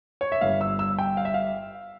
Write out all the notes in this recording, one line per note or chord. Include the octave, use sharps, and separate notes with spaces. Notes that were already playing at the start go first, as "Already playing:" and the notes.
C#5
E5
G1 G2 G3 F5
E6
E6
G5
F5
E5
F5